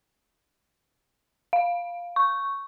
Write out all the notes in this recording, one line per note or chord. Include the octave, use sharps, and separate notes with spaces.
F5
C#6